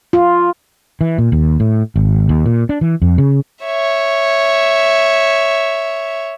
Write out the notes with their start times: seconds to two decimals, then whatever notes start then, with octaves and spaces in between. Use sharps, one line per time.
0.13 F4
1.01 E3
1.18 A#2
1.32 D#2
1.60 A2
1.96 G#1
2.29 D#2
2.46 A#2
2.69 D4
2.81 E3
3.02 F2
3.18 C#3
3.64 C#5 E5